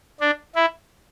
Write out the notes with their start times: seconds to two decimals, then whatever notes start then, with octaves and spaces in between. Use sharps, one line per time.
0.20 D4
0.55 E4